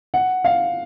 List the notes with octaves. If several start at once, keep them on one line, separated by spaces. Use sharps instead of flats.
F#5
F5